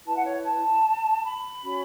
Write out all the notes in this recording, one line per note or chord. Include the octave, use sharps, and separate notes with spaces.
E4 B4 A5
F#5
C#5
A5
B5
C#4 F#4 C#5